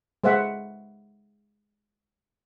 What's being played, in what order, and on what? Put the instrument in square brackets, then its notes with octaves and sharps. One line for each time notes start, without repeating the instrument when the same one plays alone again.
[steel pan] G#3 C5 E5 F#5